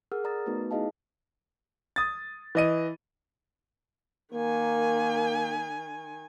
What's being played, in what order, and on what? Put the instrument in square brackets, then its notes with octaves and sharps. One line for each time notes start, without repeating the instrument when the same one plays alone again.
[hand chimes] G#4 A#4 F#5 E6 F6
A#4 D5 A#5 D#6 A6
A3 B3 D#4 F#4 B4
D#4 E4 G#4 D#5 F5 A5
[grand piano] D#6 A6
E3 D#5 D#7
[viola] D#3 G#5 [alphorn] A#3